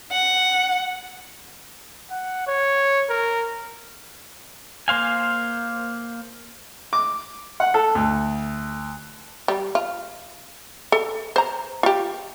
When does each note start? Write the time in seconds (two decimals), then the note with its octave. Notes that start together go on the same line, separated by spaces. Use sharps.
0.11 F#5
2.10 F#5
2.47 C#5
3.09 A#4
4.88 A#3 C5 F5 G#5
6.93 D6
7.60 F#5
7.74 A4
7.95 D2
9.48 G3
9.75 F4
10.92 A4
11.36 C5 A#5
11.83 F4 G4